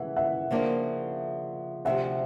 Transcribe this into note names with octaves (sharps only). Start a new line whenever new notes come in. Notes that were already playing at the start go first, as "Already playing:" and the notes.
Already playing: C#3 E3 G#3 E5 F#5
E5 F#5
C#3 F3 A#3 D4
D2 C3 F3 E5 F#5